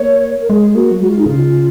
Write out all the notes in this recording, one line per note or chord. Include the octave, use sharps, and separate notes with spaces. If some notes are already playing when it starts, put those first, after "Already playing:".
Already playing: A#3 C#5
A#4
G#3 G#4
A#3 F#4
F#3
G#3 F#4
F4
D#4
C#3 F4